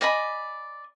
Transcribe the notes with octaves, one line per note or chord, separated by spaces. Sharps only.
D5 D#5 G#5 B5